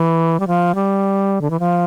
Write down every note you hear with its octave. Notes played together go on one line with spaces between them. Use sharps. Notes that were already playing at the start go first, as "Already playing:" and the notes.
Already playing: E3
G3
F3
G3
D3
E3
F3